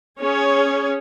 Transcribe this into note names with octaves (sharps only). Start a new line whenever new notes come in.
C#4 G#4 C#5